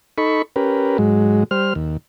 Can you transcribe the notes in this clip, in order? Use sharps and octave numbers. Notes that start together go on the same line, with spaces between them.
D#4 A4 B5 C#6
C#4 G4 A#4 B4
G#2 F#3 G#3
G3 C5 F6
D#2